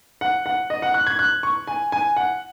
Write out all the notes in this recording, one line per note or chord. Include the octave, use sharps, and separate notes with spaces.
F#5
F#5
D#5
F#5
F#6
G#6
F#6
C#6
G#5
G#5
F#5